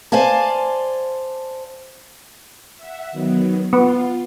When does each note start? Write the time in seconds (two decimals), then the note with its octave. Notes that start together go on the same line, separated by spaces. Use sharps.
0.12 C5 D5 F5 G#5 A5
2.77 E5 F#5
3.12 D#3 F#3 B3
3.73 B3 F4